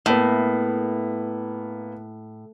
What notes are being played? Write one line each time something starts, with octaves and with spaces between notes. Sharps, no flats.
A2 A#3 B3